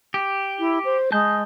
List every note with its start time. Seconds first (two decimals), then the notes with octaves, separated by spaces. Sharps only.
0.14 G4
0.59 E4
0.85 C5
1.12 G#3 A5 G6